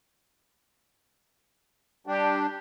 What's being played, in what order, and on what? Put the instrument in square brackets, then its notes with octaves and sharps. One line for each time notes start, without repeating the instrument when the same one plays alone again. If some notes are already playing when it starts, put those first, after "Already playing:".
[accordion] G3 D4 [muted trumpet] G4